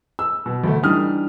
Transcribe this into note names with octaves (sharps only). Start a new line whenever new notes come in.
E6
B2
D2 A3
E3 G3 D4 D#4 D#6 F6